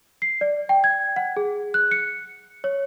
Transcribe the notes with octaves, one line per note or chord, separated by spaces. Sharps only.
C7
D5
G5
G#6
F#5
G#4
F#6
C#7
C#5